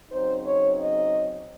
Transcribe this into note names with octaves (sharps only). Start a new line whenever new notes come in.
C#3 F#3 C4 D#4 C5
C#5
D#5